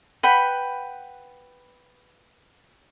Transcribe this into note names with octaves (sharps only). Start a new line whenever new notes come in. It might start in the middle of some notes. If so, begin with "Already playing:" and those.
B4 F#5 G5 B5